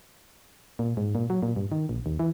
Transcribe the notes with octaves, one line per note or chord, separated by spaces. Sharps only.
A#2
G#2
A#2
F#3
A#2
G2
D#3
A#1
D#2
E3